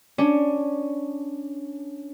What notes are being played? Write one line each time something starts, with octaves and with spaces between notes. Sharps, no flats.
C#4 D4